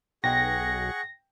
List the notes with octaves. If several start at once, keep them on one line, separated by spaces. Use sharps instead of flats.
B1 G#4 F#5 G5 C#6 A#6